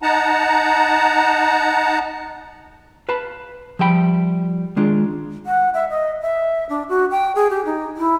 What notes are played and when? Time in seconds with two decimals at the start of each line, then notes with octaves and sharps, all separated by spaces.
0.02 D#4 F#5 A5 A#5
3.09 B4 F5 A5 B5
3.79 F3 G3 E5 G5 B5
4.76 D#3 G#3 D4 F4
5.46 F#5
5.74 E5
5.90 D#5
6.21 E5
6.69 D4
6.89 F#4
7.11 G5
7.35 G#4
7.50 G4
7.65 D#4
7.97 E4